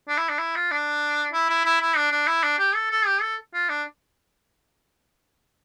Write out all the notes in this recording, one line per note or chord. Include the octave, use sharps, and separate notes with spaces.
D4
E4
D4
E4
F4
D4
E4
E4
E4
E4
D4
D4
E4
D4
G4
A4
A4
G4
A4
F4
D4